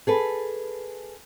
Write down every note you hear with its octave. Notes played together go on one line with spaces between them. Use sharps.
G#4 A4 B4